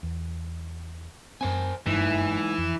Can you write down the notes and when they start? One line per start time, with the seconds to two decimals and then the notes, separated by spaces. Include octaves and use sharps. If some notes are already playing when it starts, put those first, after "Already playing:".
0.03 E2
1.41 F#2 C4 A#4 C5 G#5
1.86 F#1 G2 E3 G#3 D#4 E4
2.58 F2